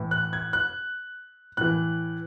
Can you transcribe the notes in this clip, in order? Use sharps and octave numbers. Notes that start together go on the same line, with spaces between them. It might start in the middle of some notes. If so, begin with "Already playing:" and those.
Already playing: A2 E3
F#6
G#6
F#6
A2 E3 F#6